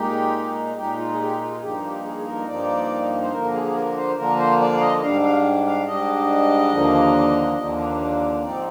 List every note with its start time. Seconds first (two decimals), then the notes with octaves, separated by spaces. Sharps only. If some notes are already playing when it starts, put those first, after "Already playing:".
Already playing: A#2 G#3 D#4 G4
0.76 A#2 G#3 D#4 G4
0.98 F4
1.14 G#4
1.20 G4
1.41 F4
1.56 G#4
1.62 G2 F3 A#3 D#4 G4
1.84 G4
2.04 G#4
2.21 G#4
2.26 A#4
2.47 G2 F3 A#3 D#4 D5
3.22 C5
3.32 D3 F3 A#3 A#4
3.54 G#4
3.65 G#4
3.74 A#4
3.96 C5
4.17 D3 F3 A#3 A#4
4.39 C5
4.60 D5
4.73 F5
4.81 D#5
5.02 G#2 G3 D4 F5
5.23 F5
5.67 F5
5.87 G#2 G3 D4 D#5
6.73 D#2 D3 F3 A#3 D4
7.57 D#2 D3 F3 A#3 D4
8.43 G#2 F3 C4 D#4 D5